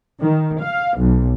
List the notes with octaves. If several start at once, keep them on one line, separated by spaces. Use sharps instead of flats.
D#3
F5
B1